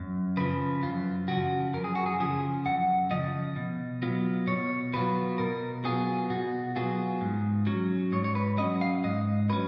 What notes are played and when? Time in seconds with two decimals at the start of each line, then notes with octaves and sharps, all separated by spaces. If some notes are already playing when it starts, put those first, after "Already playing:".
Already playing: F#2
0.37 C#3 F3 B4
0.83 F#2 F4
1.28 C#3 F3 F#4
1.73 F#2 A#4
1.84 G#4
1.95 F#4
2.06 G#4
2.20 C#3 F3 G#4
2.66 F#2 F#5
3.11 C#3 F3 D#5
3.56 B2
4.02 F#3 B3 F4
4.47 B2 C#5
4.93 F#3 B3 F4 B4
5.38 B2 A#4
5.84 F#3 B3 F4 G#4
6.30 B2 F#4
6.76 F#3 B3 F4 G#4
7.21 G#2
7.67 F#3 C#4
8.12 G#2 C#5
8.24 C#5
8.35 B4
8.57 F#3 C#4 D#5
8.81 F5
9.04 G#2 D#5
9.49 F#3 C#4 B4